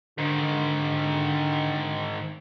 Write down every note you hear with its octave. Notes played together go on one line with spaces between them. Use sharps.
G#2 D3 D#3